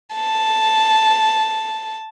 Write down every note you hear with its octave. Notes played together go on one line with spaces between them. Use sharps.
A5